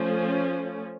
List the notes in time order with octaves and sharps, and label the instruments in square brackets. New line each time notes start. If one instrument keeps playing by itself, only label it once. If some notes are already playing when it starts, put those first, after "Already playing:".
Already playing: [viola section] F3 A3 C#4